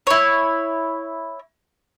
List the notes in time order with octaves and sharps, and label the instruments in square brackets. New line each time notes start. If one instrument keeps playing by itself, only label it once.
[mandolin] E4 C#5